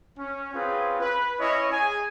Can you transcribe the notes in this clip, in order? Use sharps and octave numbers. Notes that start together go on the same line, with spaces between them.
C#4
C4 C#4 F4 G#4 B4
B4
C#4 E4 C#5 D#5
G#4 G#5